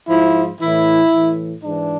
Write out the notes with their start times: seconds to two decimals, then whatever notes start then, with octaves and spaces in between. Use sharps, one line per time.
0.09 G#2 F3 E4
0.61 A2 E3 E4
1.12 A2 E3
1.64 G#2 E3 D4